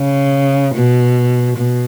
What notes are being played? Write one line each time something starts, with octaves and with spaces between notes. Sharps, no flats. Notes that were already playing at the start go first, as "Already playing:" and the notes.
Already playing: C#3
B2
B2